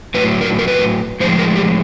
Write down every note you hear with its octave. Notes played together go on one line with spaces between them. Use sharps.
A2 F#3 B4
A#4
A#4
B4
A2 F3 G#3 C5
A#4
G4